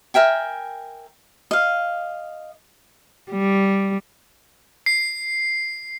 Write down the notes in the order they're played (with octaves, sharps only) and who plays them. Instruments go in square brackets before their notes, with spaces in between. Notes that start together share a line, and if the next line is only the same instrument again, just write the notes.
[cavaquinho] A#4 E5 G5 G#5
D#5 F5
[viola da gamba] G3
[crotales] C7